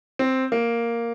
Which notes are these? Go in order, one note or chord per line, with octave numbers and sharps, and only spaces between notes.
C4
A#3